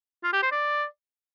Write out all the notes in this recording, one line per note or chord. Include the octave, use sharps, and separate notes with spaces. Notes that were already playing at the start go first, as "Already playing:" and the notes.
F4
G4
C5
D5